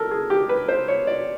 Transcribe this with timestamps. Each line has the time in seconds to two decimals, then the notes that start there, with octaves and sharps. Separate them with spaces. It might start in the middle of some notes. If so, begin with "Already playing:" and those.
Already playing: A4 A#4
0.11 G#4
0.30 G4
0.49 B4
0.68 C5
0.88 C#5
1.07 D5